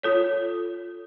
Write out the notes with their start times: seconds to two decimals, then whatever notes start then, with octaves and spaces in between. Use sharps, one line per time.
0.03 F4 A4 C#5